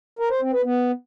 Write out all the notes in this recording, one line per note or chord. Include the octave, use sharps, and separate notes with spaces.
A#4
C5
C4
B4
B3